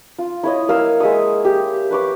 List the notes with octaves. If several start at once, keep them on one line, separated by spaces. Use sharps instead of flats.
F4
E4 C#5 D#5
A#3 F5 D#6 E6
G#3 E5 C#6 D#6
G4
B4 C#6 D6